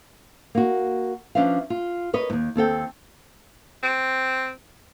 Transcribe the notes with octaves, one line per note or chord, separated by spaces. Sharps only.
A#3 F#4
F3 C#4 D4 B4 E5 F5
F4
A#4 B4 C#5 D#5
D#2 G#2
D#2 C4 A4 G5
C4